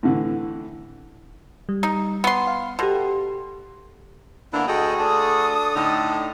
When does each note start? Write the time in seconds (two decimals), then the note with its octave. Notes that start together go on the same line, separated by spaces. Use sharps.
0.03 A2 D3 E3
1.69 G3
1.83 D#4
2.24 B3 C6
2.47 F5
2.79 B2 G4 A4 C6
4.53 D3 A#3 B3 D4 E4
4.68 D2 F#4 G#4 A4 D#5 G5
4.99 D4 A4 D#6
5.74 A2 D3 D#4